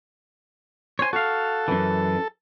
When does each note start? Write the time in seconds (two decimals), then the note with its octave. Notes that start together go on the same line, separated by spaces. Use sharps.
0.99 C5 C#5 G#5
1.13 F#4 A4 F5
1.68 F#2 E3